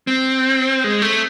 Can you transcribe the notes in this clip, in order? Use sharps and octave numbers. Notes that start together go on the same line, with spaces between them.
C4
G#3
A3